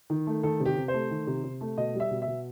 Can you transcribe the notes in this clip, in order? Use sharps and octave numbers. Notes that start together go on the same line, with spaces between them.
D#3
A3
D#3 A4
C3
G4
C3
C5
A3
D#3
C3
C3
A3
B2 D#5
G3
E5
B2
E5
B2